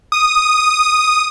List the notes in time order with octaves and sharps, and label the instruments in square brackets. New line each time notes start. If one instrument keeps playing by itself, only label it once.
[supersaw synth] D#6